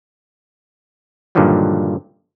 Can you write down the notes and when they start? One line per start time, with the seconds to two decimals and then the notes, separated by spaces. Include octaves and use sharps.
1.35 G2 A#2 D3 D#3 F3 F#3